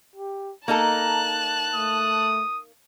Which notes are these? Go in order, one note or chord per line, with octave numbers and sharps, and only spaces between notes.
G4
A#3 D#4 A4 A5 A#5 F#6
A3 D#6